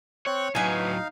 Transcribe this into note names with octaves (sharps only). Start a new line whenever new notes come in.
C4 C#5 C#6 F#6
A2 F#3 D#4 B4 F5 G#5